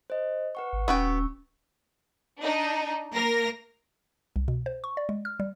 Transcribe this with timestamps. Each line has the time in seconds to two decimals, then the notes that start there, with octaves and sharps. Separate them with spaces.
0.10 C5 D#5
0.55 B4 F#5 C#6
0.73 G#1
0.88 D#1 B3 C#4 F#4 G5 C#6 E6
2.40 D4 D#4
3.13 A#3 A#4 A#6
4.36 C2
4.48 B2
4.66 C5
4.84 C#6
4.97 D5
5.09 G#3
5.25 F6
5.40 G3